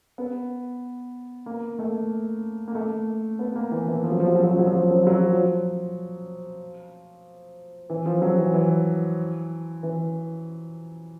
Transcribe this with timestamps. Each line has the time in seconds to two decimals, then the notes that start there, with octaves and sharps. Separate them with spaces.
0.18 B3
1.46 A#3
1.79 A3
2.68 A#3
2.75 A3
3.39 B3
3.56 A#3
3.71 E3
3.88 E3
4.04 F3
4.12 F#3
4.20 F3
4.27 F#3
4.35 F3
4.43 F#3
4.52 F3
4.59 F#3
4.67 F3
4.75 F#3
4.83 F3
4.91 F#3
4.99 F3
5.07 F#3
5.14 F3
5.32 F3
7.90 E3
8.06 F3
8.22 F#3
8.38 E3
8.54 E3
9.83 E3